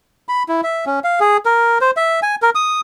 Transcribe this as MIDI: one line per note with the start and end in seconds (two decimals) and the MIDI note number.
0.29 0.43 83
0.49 0.61 64
0.64 0.85 76
0.86 1.00 61
1.04 1.20 77
1.20 1.37 68
1.46 1.78 70
1.81 1.91 72
1.97 2.20 76
2.23 2.35 80
2.42 2.50 70
2.55 2.81 87